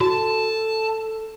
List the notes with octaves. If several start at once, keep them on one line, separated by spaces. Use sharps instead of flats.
F#4 A4 A5